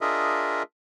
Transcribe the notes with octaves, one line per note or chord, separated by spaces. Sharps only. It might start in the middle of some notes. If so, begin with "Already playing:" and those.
D4 F4 G#4 A#4 D#5 E5